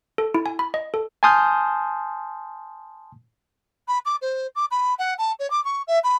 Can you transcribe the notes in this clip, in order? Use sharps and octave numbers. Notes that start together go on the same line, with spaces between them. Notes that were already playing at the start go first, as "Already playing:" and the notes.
A4
E4
G#5
B5
D#5
A4
G#5 A5 C6 D#6 F6 G6
B5
D6
C5
D6
B5
F#5
A5
C#5
D6
C#6
E5
B5